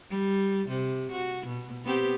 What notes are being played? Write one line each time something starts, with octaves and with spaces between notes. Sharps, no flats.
G3
C3
F#4
B2
B3 C4 G4